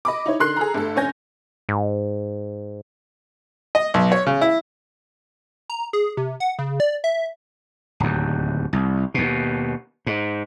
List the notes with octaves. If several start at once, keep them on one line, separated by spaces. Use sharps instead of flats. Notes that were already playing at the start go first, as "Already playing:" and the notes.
D#5 B5 D6
D#4 E4 C#5
D3 D#4 A#4 C6 F#6 C7
G#4 A4 A#5
G1 A3 A4
F1 C#4 C#5 G#5 G6 A#6
G#2
D#5
B1
C#5
C#3
E4
A#5
G#4
C3
F#5
C#3
D5
E5
D1 D#2
C2
D#2 B2
G#2